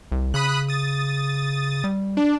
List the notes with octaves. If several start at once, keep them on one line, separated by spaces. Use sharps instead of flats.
C2
C#3 B5 D#6 F#6
D#6 A6
G3
D4